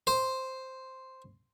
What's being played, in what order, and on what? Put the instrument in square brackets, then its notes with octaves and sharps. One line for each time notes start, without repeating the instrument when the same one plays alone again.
[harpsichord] C5